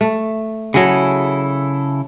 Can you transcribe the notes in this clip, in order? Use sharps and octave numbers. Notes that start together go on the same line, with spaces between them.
A3
C#3 F#3 E4 G#4 A4